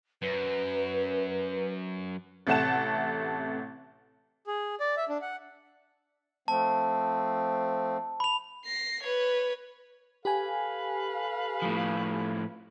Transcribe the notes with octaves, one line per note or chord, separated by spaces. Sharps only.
F#2 B4
A1 C3 A3 F#5 A5 E7
G#4
D5
E5
D4
F#5
F3 A3 C4 A5
B5 F7
A#6 C7
B4 C#5
G4 A4 B4 F5 G#5
A2 F3